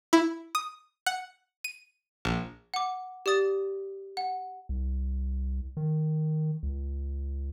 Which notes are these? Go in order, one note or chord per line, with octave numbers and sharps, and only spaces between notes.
E4
D#6
F#5
D#7
A#1
F#5 D6
G4 D5 D#6 A6
F#5
C2
D#3
C#2